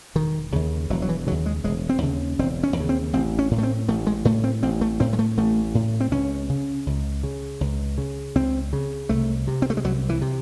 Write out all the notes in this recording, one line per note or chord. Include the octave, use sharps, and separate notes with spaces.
E1 D#3
D#2 C#3
E1 F#3
F#3
E3
D#2 C#3 F#3
G#3
E1 G#3
C4
D#2 C#3
E1 C4
C#4
D#2 C#3
C4
A1 C4
C#4
A2
A3
C4
A1 A3
G#3
A2 A3
C4
A1 C4
A3
A2 C4
G#3
A3
A1 A3
A2
C4
C#2 C#4
C#3
C#2
C#3
C#2
C#3
C#2 C4
C#3
C2 A3
C3
C4
A3
G#3
C2 F#3
E3
C3